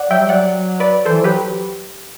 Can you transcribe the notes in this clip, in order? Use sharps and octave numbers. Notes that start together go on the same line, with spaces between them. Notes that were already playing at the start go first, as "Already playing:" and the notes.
Already playing: D5 F#5
F#3 E5 G5
G3
F#3 D5 F#5
B4 D5
E3 A4 C5
F#3 G4 B4